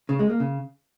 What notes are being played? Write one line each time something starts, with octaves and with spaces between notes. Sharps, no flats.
C#3
G#3
A#3
C#3